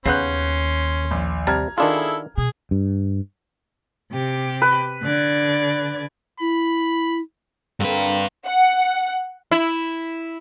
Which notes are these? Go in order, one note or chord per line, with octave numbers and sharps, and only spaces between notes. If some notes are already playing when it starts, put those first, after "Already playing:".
D#2 C#3 B3 C#4 C6 F#6 G6 C7
A#1
C3 G3 A5 A#5 F6 G#6
D#3 D4 E4 F4 G#4 A4
B2 G#4
G2
C3 G4
B4
D3 D5 G#6
E4 B5
G2 D3 A#3 C4 B4
F#5
E4